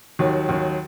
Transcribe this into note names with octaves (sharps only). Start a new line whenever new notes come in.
D#2 D#3 F#3
D#2 D#3 F#3